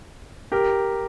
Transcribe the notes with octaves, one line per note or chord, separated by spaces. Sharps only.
G4 A#4